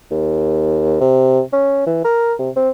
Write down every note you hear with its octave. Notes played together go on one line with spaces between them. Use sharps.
D#2
C3
C#4
E3
A#4
C3
C4